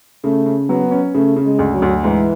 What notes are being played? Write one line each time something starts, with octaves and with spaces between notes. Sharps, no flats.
C#3 A3
C#3
F#3 B3
C#4
C#3 A3
C#3
G#3
D2
F#3
D2
G#2 E3